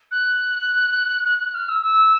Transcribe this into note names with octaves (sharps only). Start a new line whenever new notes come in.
F#6
F#6
F#6
F6
E6
E6